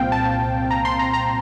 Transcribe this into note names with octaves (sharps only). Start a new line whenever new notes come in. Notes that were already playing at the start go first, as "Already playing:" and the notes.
Already playing: C2 A#2 C4 F5 G5
A5
A#5
C6
A#5
A#5